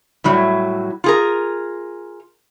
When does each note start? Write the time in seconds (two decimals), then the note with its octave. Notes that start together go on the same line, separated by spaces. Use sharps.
0.24 A2 F#3 G3 E4
1.04 F4 G#4 A#4